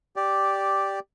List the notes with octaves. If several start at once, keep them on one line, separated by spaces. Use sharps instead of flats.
G4 D5